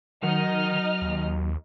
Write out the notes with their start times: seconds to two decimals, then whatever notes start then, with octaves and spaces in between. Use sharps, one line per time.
0.23 D#3 F#3 D#4 A#4 D#5 F#5 F6
1.02 D#2